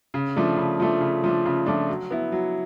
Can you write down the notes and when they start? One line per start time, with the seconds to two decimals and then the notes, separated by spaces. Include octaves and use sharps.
0.14 C#3
0.36 F3 A3 D4
0.57 C#3
0.80 F3 A3 D4
1.01 C#3
1.24 F3 A3 D4
1.45 C#3
1.66 F3 A3 D4
1.89 F#3
2.11 B3 E4
2.32 F#3